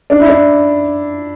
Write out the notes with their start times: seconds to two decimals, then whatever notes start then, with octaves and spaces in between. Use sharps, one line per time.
0.10 D4
0.20 E4
0.28 D4